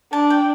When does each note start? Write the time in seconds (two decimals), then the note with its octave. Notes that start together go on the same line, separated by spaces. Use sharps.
0.13 D4 A5
0.30 G5